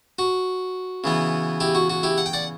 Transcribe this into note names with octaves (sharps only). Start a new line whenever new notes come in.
F#4
C#3 E3 B3
E4 G4
F#4
F#4
E4 G4
F#5
G5
D5 F#5